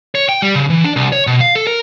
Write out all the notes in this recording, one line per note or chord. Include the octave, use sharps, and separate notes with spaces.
C#5
G5
G3
C#3
E3
D4
C2
C#5
B2
F5
A4
A#4